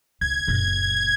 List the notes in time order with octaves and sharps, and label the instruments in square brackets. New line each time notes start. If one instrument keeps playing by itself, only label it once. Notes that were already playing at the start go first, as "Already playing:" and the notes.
[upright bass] C#2 [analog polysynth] G#6
[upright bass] F#1 A#2